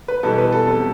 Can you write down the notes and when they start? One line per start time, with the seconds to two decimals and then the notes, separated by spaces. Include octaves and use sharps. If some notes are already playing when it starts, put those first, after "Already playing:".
0.08 B4
0.23 E2 B2 G3 A4
0.38 B4
0.52 A4
0.67 E2 C3 G3 A4